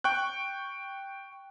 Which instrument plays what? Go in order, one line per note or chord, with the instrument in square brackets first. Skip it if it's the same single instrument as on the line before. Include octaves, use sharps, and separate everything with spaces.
[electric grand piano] G5 C#6 F#6